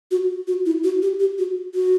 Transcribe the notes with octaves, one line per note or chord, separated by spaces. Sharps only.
F#4
F#4
E4
F#4
G4
G4
F#4
F#4